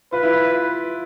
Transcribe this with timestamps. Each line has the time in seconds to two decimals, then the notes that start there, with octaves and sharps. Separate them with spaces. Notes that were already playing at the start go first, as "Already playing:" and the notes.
0.12 F4 B4
0.23 E4
0.32 F4